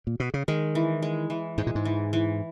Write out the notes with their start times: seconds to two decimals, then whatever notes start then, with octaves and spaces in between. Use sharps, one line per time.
0.07 A#2
0.20 B2
0.34 C#3
0.48 D#3 G#3
0.75 E3
1.02 G#3
1.30 E3
1.58 G#2 G#3
1.67 A#2
1.75 G#2
1.85 E3
2.13 E3